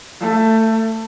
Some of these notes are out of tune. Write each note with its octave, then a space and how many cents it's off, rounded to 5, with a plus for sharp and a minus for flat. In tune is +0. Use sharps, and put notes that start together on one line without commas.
A3 +20